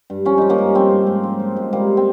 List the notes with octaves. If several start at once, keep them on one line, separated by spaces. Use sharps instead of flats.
G2
F3 C#4
F3 D#4
A#3 C#4
G2
F3 C4
G#2
G#2
F3
F3
G#2
G3 A#3
C4